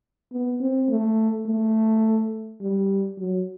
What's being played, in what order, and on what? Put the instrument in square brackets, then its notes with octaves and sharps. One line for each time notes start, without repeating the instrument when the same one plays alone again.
[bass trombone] B3
C4
A3
A3
G3
F#3